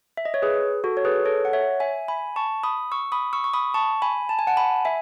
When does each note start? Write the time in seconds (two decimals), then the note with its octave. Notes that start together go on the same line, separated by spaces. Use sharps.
0.17 E5
0.25 D#5
0.34 C#5
0.42 G#4 B4
0.84 F#4 A4
0.97 C#5
1.05 G#4 B4
1.25 A4 C#5
1.45 F#5
1.53 C#5 E5
1.80 E5 G#5
2.08 G#5 B5
2.36 A5 C#6
2.64 B5 D#6
2.92 C#6 E6
3.12 B5 D#6
3.33 C#6 E6
3.44 C#6
3.53 B5 D#6
3.74 A5 C#6
4.02 G#5 B5
4.29 A5
4.39 G#5
4.47 F#5 A5
4.57 G#5 B5
4.85 E5 G#5